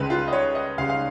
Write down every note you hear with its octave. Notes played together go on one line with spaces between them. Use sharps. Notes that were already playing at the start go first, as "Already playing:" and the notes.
Already playing: C#2 C#3 G#3 B4
F4
D#5
C#5
D#5
C#2 C#3 G#3 F5
F5